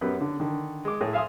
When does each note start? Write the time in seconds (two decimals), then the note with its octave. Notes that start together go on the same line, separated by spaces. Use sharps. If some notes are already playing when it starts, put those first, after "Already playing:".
0.01 F#2 B3 G4 B5
0.21 D3
0.40 D3 D#3
0.85 G#3 D6
1.01 A2 G#4
1.13 E5 F5 G#5 C6 D#6